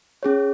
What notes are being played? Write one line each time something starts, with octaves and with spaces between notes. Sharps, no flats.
C#4 G#4 C#5